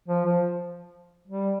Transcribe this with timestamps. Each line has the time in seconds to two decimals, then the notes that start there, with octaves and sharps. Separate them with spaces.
0.08 F3
0.25 F3
1.28 G3